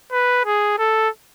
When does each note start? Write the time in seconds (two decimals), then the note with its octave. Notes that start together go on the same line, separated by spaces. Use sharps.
0.12 B4
0.45 G#4
0.79 A4